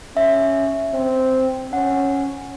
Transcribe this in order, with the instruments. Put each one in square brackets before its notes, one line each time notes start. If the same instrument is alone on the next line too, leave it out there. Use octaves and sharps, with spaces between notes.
[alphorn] C#4 [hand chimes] E5
[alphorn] C4
[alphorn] C#4 [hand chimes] F#5